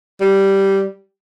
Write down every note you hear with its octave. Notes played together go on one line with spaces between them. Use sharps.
G3